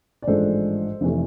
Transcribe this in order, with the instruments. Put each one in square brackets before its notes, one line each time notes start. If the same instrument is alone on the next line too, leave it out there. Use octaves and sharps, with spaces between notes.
[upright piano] D5
A1 G#2 F3 G#3 D4 A4 C5
F1 C3 E3 A3